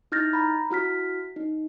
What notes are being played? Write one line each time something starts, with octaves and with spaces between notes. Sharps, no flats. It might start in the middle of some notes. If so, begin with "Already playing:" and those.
D#4 E4 F6 G6 A6 A#6
A#5 B5
E4 F#4 F6 B6
D#4